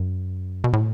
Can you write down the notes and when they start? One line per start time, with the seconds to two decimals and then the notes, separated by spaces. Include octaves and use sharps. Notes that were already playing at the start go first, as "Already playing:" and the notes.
Already playing: F#2
0.64 B2
0.73 A2